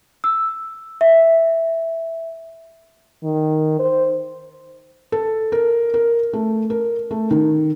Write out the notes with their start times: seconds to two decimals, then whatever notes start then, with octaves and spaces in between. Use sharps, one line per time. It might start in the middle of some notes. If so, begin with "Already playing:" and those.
0.24 E6
1.01 E5
3.23 D#3
3.79 C5
5.12 A4
5.52 A#4
5.94 A#4
6.33 A3
6.70 A#4
7.11 A3
7.31 D#3